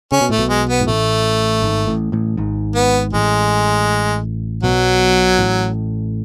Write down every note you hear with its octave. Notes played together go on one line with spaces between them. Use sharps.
C#3 C#4
B2
A2 A3
B1 B2
G#3
B3
G#2
A1 A2 A3
G#1 G#2
A1 A2
A1 A2
G#1 G#2
B3
A1 A2 G#3
B1 B2 F#3
A1 A2